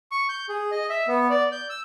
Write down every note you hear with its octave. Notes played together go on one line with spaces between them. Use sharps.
C#6
G6
G#4
D#5
E5
B3
D5
G6
E6